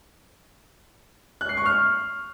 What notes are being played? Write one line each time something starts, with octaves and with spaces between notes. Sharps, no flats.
F#6
C7
C#6
F6